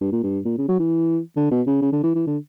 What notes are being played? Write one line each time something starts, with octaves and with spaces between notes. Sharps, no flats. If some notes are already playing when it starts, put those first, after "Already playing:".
G2
A#2
G2
A#2
C#3
F#3
E3
D3
B2
C#3
C#3
D3
E3
E3
D3